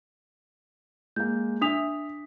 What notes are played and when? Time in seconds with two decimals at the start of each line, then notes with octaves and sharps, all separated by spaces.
1.16 G#3 A#3 G6
1.62 D4 E5 D#6 B6 F7